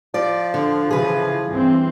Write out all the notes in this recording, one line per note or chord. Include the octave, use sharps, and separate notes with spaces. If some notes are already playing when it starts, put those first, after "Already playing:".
F3 D5
D3
C#3 E3 G#4 B4
G2 E3 C4